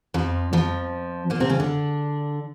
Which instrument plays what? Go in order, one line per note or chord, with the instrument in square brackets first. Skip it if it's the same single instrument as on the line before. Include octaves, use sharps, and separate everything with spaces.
[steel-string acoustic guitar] F2 F3
F2 F3
A#2 A#3
C3 C4
C#3 C#4
D3 D4